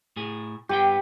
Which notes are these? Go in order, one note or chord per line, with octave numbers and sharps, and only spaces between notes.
A2 G#4
G2 B3 G4 G5